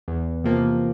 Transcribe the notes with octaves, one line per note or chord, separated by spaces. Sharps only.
E2
C3 F3 A#3